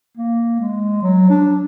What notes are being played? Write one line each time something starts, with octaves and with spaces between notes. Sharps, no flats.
A#3
G#3
F#3
D4